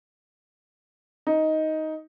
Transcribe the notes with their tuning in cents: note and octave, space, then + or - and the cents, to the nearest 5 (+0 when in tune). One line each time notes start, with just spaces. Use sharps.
D#4 +10